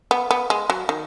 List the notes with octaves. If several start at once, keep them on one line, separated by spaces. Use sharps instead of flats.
B3
B3
G#3
F#3
D#3